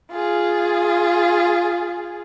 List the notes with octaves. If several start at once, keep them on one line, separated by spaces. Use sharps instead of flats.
F4 G#4